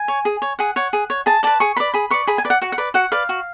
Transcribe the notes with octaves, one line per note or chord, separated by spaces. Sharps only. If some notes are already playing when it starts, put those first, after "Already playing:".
Already playing: G#5
C#5
G#4
C#5
G#4 F#5
C#5 F#5
G#4
C#5
G#4 A5
B4 D5 A5
G#4 C#6
B4 D5 B5
G#4 B5
B4 D5 C#6
G#4 B5
G#5
B4 D5
F#5
F#4 F#5
F#5
B4 D5
F#4 F#5
B4 D5 F5
F#4